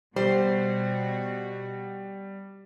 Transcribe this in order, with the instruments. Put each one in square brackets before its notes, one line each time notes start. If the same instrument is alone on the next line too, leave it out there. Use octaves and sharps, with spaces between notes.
[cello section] B2 F#4 [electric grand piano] G3 [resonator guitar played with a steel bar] C5